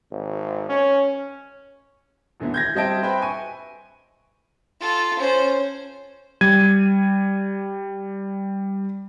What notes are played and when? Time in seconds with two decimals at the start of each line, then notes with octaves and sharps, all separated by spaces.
0.11 G#1
0.69 C#4
2.40 D#1 E2 D3 A3 B3 E4
2.54 G6 G#6 A#6
2.75 G3 C4 D#5 E5 A5 D7
3.03 B4 C5 E5 G5 B5
3.22 G#5 C#6 D#7
4.80 F4 A4
5.19 C#4 C5
6.41 G3 G#6 D#7